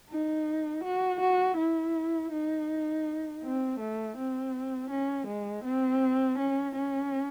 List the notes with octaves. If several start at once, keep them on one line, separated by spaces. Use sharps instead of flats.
D#4
F#4
F#4
E4
D#4
C4
A3
C4
C#4
G#3
C4
C#4
C#4